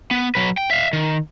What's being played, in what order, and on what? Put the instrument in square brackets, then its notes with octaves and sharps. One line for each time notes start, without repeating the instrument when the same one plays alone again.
[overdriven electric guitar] B3
F#3 B4
G5
E5 F5
D#3